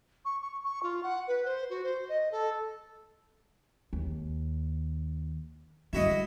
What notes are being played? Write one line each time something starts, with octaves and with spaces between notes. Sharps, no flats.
C#6
C#6
C#6
F4
F#5
B4
C5
F#4
C5
D#5
A4
D#2
D3 G3 E4 F#4 D#5